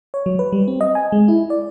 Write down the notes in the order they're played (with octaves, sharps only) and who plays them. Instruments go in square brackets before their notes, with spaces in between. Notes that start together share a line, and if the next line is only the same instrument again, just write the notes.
[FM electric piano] C#5
F#3
B4
G3
C4
D#5
G#5
G#3
E4
D5